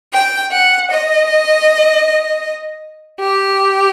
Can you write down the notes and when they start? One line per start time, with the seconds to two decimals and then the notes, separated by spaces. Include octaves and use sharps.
0.14 G5
0.52 F#5
0.90 D#5
3.19 G4